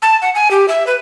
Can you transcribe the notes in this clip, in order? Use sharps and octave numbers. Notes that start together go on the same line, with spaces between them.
A5
F#5
G#5
G4
E5
B4